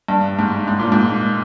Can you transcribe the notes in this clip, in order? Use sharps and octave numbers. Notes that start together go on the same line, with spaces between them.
G2
G#2
G#2
A#2
G#2